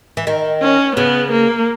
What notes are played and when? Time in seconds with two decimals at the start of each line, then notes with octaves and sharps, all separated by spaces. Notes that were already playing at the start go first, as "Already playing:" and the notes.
0.17 E3
0.27 D#3
0.62 C#4
0.96 C#3 B3
1.32 A#3